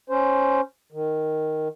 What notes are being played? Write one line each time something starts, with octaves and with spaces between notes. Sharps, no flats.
C#4 C5
D#3